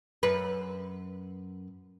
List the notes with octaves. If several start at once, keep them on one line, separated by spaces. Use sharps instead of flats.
F#2 B4